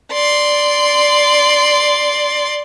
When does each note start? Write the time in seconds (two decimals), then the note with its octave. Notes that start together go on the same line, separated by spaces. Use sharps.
0.13 D5 C6